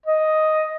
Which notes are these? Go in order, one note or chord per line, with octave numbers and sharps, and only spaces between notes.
D#5